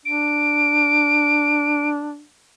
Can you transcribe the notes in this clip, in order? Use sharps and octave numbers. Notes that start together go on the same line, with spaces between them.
D4 D7